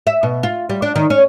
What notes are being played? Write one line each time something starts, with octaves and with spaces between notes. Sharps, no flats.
E5
B2
F4
G3
D4
D#3
C#4